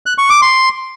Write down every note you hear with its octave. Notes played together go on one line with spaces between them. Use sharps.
F#6
C#6
D6
C6